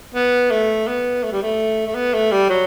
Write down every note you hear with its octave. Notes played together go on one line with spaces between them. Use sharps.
B3
A3
B3
A3
G3
A3
A3
B3
A3
G3
F#3